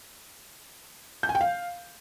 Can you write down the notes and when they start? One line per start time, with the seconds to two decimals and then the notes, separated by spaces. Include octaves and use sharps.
1.23 G6
1.29 G#5
1.35 G5
1.41 F5